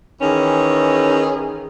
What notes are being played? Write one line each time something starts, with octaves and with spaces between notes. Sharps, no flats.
D#3 E3 C#4 G#4